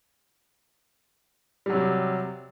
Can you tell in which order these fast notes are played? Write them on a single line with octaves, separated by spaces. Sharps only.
G3 F#3 C3